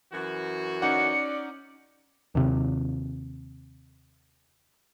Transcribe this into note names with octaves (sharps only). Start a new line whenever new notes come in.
F#2 E3 F#4
C#4 D#4 D5 F#5 C#7
D#2 C3